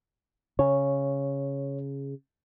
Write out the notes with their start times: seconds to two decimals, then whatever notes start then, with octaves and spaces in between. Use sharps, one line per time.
0.59 C#3 C#5